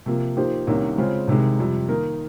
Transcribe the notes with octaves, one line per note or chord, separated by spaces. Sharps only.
C3 F3 A#3
F3 A#3 D#4 G4 C5
C2 C3 D#3 A#3 C#4
C#3 G#3 C4 F4
C2 C3 D#3 G#3
F2 C3 G3
D#3 A#3 D#4 A#4